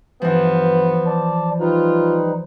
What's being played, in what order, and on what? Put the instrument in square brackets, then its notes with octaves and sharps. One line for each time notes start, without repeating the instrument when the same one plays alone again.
[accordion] G2 [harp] E3 F3 [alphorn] B3
[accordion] D5 A5
[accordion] G3 D#4 B4 [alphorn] F4